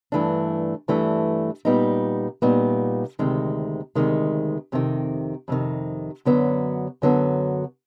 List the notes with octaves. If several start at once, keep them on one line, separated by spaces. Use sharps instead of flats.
G2 E3 A3 D4
G2 E3 A3 D4
A#2 G3 B3 D#4
A#2 G3 B3 D#4
D2 C3 D#3 G#3
D2 C3 D#3 G#3
F2 C3 D#3
F2 C3 D#3
F#2 D3 F#3 B3
F#2 D3 F#3 B3